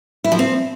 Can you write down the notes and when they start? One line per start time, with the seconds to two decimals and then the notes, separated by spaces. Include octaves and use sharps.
0.24 E4
0.32 F3
0.39 C4